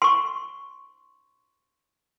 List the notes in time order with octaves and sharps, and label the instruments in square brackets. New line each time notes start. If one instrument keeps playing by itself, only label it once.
[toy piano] C6 C#6